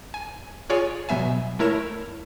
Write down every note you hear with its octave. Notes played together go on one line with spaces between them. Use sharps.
G#5
F4 G#4 C#5 D5 G#5
B2 F#3 B3 E5 G#5
A3 E4 A#4 C#5 E7